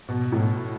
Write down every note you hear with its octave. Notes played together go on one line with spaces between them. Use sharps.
B2
A2